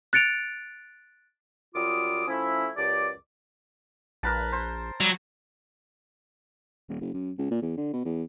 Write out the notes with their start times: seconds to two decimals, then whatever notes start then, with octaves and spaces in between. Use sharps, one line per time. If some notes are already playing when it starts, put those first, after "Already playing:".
0.13 F#6 A6 C#7 D7 F7
1.75 F#2 G3 F4 D6 D#6
2.28 F3 A3 C#4 E4
2.75 C#2 F#2 G4 D5
4.23 A#1 A#4 B4 A5
4.52 C5
5.00 F#3 G3
6.89 D#1
7.00 F#1
7.14 F#2
7.38 C#2
7.51 A#2
7.62 E2
7.77 D3
7.93 B2
8.05 E2